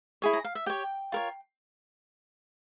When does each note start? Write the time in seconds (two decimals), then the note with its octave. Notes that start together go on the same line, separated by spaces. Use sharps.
0.22 E4 G#4 C#5
0.33 A#5
0.45 F5
0.55 E5
0.66 G4 C#5 G5
1.12 F4 A#4 C#5